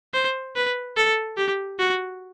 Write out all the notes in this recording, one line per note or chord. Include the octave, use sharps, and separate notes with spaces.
C5
B4
A4
G4
F#4